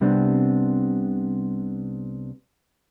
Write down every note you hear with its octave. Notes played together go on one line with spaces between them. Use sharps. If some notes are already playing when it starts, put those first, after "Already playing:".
C2 C3 G3 B3 C4 D4